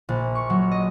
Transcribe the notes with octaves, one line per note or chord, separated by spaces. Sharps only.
A#1
C#6
F#3
D#5